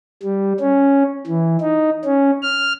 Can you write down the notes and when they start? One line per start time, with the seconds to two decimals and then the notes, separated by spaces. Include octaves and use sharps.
0.23 G3
0.60 C#4
1.27 E3
1.61 D#4
2.04 C#4
2.43 F6